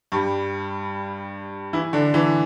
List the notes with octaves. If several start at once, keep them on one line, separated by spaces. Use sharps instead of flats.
G2 G3
E3 E4
D3 D4
E3 E4